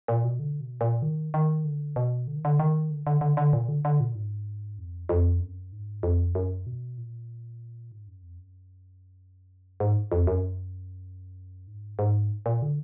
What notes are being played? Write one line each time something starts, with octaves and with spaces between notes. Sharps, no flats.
A#2
B2
D3
B2
A#2
D#3
D#3
D3
B2
D3
D#3
D3
D#3
D3
D3
D3
D3
A#2
D3
D3
A#2
G#2
F2
F2
F#2
G#2
F2
F#2
B2
A#2
G#2
F#2
F2
F#2
G#2
F2
F#2
G#2
G#2
A#2
D3